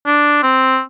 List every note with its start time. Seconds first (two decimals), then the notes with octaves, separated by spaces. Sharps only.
0.07 D4
0.43 C4